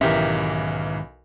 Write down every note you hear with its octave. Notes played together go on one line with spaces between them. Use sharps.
B1 G#2 D#3 E3 C#4 G4 A#4 E5